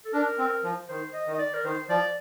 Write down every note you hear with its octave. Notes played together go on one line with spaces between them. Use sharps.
A4
D4 A#4
C4
F3
D#3 C5
D#5
D#3
D#5
D5
A#4
D#3 C5
F3 D5